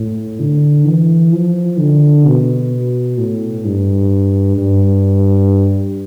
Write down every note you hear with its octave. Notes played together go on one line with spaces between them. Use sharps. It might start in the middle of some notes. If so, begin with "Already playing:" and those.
Already playing: A2
D3
E3
F3
D3
B2
A2
G2
G2